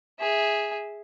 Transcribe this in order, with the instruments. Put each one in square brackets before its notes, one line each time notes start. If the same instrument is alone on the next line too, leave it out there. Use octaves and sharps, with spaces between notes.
[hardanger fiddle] G#4 E5